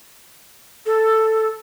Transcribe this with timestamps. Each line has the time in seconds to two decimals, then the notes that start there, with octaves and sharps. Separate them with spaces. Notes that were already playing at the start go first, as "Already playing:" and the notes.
0.86 A4